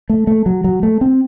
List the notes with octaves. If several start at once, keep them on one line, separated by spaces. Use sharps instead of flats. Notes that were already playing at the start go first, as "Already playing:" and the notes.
A3
A3
F#3
F#3
A3
C4